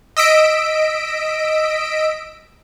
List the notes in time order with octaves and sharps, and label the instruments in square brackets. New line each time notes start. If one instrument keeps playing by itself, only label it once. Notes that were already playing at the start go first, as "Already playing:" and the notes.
[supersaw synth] D#5 E6 B6 D7